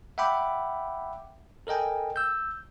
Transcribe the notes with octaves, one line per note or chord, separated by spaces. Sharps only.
E5 F#5 G5 B5 D6
A4 A#4 D#5 G5 G#5
E6 G6